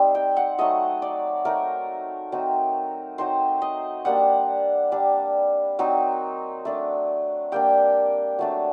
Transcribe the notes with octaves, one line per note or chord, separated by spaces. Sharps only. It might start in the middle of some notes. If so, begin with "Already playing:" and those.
Already playing: G3 C4 D#4
G5
F#5
F#3 A3 D#4 D#5
D5
A3 D#4 A#4
F#3 C4 D#4
F#3 C4 D#4 C5
D#5
G3 A#3 D4 F#5
G3 D4
F#3 C4 D#4
A3 D4
G3 A#3 D4 G5
F#3 A3 D4